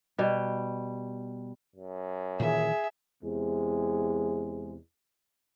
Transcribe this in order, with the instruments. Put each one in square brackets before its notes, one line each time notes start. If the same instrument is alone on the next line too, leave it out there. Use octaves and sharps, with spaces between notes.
[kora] B2 G3
[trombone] F#2
[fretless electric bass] A#2 D#3 E3 [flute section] G#4 [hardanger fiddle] E5
[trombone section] E2 C3 G#3